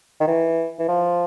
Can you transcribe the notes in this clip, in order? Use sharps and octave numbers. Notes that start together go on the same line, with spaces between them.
D#3
E3
E3
F3